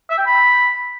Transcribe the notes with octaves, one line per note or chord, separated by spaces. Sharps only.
E5
G5
B5